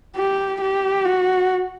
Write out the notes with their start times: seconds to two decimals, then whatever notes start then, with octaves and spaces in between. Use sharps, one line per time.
0.17 G4
0.61 G4
1.05 F#4